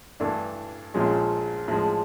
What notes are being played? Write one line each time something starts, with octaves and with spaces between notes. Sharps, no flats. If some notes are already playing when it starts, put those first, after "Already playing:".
G2 E3 A3 D4
A#1 A#2 F3 G#3 C#4
A2 F3 G#3